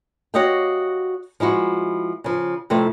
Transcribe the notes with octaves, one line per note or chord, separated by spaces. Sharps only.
F#4 G4 C#5 D#5 F5 G5
F3 G#3 E4 F#4
C#3 F3
F2 C3 A3 E4 C5